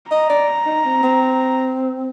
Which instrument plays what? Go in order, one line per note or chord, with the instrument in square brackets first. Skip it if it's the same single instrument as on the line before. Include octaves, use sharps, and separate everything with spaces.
[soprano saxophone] D#5 [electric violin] A#5
[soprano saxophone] D5
D#4
C4
C4